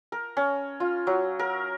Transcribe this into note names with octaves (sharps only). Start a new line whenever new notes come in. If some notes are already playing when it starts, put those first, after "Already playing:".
A#4
C#4
F4
F#3
A#4